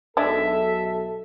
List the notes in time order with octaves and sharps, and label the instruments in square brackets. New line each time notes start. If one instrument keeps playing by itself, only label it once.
[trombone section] B1 A4 [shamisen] G#3 D4 [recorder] E5